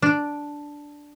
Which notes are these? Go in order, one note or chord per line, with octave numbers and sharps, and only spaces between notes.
D4